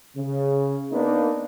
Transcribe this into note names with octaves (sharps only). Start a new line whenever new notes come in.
C#3
A#3 B3 D4 D#4